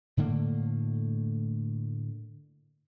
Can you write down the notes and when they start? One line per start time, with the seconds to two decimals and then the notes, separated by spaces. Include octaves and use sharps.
0.17 A2 D3 A3 A#3